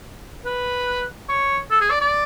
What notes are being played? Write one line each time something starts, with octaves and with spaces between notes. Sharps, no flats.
B4
C#5
A4
G#4
D5
D5